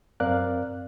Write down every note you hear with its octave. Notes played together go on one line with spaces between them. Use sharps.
F#2 C4 A#4 D5 F5 F#6